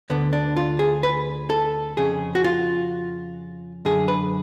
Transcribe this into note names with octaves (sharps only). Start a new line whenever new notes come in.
D2 D3 B3
D4
F4
G#4
B4
A4
F2 C#3 G#4
F#4
F4
F#2 D3 G#4
B4